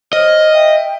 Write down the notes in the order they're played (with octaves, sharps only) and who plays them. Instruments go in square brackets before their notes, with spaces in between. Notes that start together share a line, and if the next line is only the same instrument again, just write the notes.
[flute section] C5 C#5 F6 [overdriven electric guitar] D#5
[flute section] E5 G5